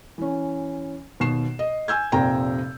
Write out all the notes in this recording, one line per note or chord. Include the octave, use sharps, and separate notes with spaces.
E3 C#4
D#2 B2 C7 E7
D#5
G#5 E6 G6 G#6
F1 A#2 C4 G5 A#5